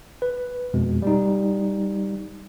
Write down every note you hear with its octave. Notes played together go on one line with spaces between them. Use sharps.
B4
F2 B2 G#3
G3 D#4